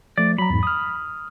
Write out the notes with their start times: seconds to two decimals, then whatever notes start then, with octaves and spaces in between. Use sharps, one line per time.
0.18 F3 A3 D5
0.38 F#3 A#5 B5
0.50 E2 G#2
0.63 D#6 F6